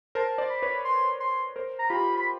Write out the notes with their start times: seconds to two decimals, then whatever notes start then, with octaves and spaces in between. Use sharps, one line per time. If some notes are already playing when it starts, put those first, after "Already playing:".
0.15 A#4 C5 A5
0.38 C5 D5
0.50 B5
0.62 B4 C#5
0.85 C6
1.20 C6
1.56 A#4 C5
1.79 A#5
1.90 F4 G4 B5
2.17 B5